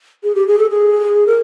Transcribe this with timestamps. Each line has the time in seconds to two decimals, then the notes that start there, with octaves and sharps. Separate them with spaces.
0.23 G#4
0.35 G4
0.47 G#4
0.59 A4
0.70 G#4
1.27 A#4